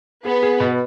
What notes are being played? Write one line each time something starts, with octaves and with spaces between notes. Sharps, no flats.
B3 G#4
G#4
B2